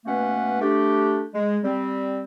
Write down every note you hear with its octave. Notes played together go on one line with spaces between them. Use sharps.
B2 A3 A#3 C#4 B4 F#5
A3 D4 G4
G#3
G3 C4